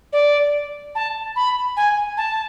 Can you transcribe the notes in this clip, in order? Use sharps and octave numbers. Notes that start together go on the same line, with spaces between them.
D5
A5
B5
G#5
A5